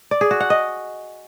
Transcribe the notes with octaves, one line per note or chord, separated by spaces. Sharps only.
D5
G#4
F#4
F#5
D#5